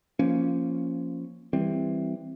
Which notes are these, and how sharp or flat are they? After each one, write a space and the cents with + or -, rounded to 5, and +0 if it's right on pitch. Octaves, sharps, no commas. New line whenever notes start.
F3 -15 A#3 +0 C#4 +0
E3 +0 G3 +15 C4 +5